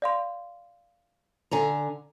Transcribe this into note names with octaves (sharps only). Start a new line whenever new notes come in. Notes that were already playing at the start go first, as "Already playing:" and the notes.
D5 F5 C6
D3 G#5 A#5